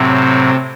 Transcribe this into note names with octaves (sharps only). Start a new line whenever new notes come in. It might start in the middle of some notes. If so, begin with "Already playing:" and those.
Already playing: A2 C3 F#3 C4